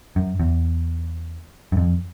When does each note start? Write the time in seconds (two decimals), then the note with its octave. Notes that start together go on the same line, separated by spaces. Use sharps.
0.16 F#2
0.40 E2
1.72 F#2
1.77 F2